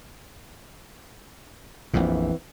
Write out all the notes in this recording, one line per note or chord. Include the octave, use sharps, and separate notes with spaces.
A#1 F2 A#2 E3 B3 C4